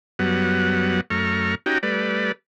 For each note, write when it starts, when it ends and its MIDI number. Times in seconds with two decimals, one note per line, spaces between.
0.19 1.01 42
0.19 1.01 54
0.19 1.01 55
0.19 1.01 59
0.19 1.01 78
1.10 1.55 42
1.10 1.55 57
1.10 1.55 82
1.10 1.55 85
1.10 1.55 89
1.66 1.78 61
1.66 1.78 63
1.66 1.78 66
1.66 1.78 67
1.66 1.78 79
1.66 1.78 82
1.83 2.32 55
1.83 2.32 57
1.83 2.32 71
1.83 2.32 74